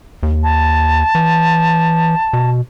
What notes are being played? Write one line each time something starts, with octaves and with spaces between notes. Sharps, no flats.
D#2
A5
E3
B2